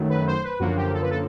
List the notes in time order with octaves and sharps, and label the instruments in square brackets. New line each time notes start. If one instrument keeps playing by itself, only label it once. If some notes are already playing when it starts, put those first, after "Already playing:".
Already playing: [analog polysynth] F#2 D#3 F#3 A3
B4
C5
B4
F#2 D3 F3 A#3 F#4
G4
A4
B4
A4